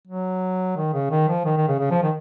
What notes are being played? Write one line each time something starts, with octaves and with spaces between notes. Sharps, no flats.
F#3
D#3
C#3
D#3
F3
D#3
D#3
C#3
C#3
F3
D#3